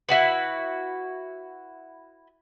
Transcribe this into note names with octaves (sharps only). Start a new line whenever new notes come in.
E4 F#4 B4